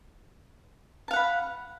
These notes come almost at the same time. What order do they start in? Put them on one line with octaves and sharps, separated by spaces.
A5 F5 F#5 B5